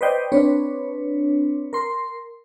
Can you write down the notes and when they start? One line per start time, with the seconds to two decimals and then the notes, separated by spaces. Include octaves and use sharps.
0.01 B4 C5 D5 D#5 G5
0.32 C4 D4 B4 C#5
1.73 A#4 C6